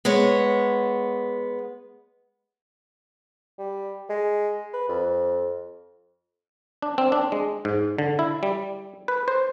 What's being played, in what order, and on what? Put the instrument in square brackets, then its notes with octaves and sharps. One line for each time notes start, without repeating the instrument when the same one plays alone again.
[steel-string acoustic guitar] G#3 B3 C#5
[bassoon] G3
G#3
B4
F2
[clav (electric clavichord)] D4
C4
D4
G#3
G#2
D3
E4
G3
B4
C5